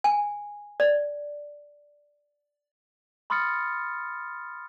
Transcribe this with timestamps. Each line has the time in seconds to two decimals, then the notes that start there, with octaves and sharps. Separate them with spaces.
0.04 G#5
0.80 D5
3.30 B5 C6 D#6 F6 A6 C#7